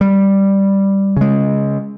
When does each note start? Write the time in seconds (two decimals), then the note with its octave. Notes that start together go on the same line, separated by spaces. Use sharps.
0.01 G3
1.17 C#3 G#3